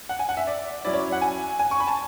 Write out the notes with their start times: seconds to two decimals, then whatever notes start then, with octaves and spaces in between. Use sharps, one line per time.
0.09 F#5
0.19 G#5
0.29 F#5
0.37 E5
0.47 D5
0.85 F#3 C#4 E4 D5
0.93 C#5
1.12 F#5
1.22 G#5
1.59 G#5
1.71 C#6
1.80 B5
1.87 A5